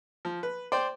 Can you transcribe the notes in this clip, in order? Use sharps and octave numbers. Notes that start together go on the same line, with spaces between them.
F3
B4
C5 D5 G5 C6